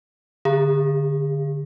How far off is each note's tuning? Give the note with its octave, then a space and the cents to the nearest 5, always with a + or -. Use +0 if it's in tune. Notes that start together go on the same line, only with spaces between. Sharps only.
D3 +0 G#4 -40